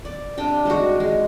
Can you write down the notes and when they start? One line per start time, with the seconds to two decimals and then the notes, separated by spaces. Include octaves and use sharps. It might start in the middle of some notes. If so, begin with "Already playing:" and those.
0.05 D5
0.38 C3 D4 G5
0.65 G3 G#3 D#4 F#4
1.00 G#3